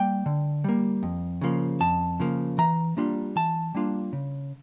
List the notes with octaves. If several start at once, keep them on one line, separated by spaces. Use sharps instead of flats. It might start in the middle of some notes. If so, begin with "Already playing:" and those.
Already playing: G3 A#3 G5
D3
G3 A#3
F2
C#3 F3 A#3
F2 A5
C#3 F3 A#3
E3 A#5
G3 A#3 D4 F4
E3 A5
G3 A#3 D4 F4
C#3